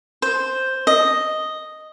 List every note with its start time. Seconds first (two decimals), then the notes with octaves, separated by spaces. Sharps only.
0.22 C5
0.87 D#5